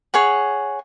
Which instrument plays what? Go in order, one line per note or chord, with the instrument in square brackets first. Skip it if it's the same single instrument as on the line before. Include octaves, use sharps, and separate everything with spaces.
[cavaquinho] G#4 C#5 F#5